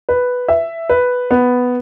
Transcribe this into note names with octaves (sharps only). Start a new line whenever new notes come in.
B4
E5
B4
B3